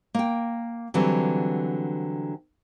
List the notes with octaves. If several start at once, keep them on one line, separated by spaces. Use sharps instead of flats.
A#3 G5
D3 E3 F#3 G3 C4